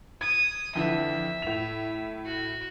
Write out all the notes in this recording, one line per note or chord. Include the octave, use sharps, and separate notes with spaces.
D#6 G#6
F2 D3 E3 E5
A2 F7
F#4